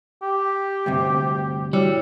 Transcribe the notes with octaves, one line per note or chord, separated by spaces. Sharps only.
G4
D2 G2 C3
G3 E4 F#4 C#5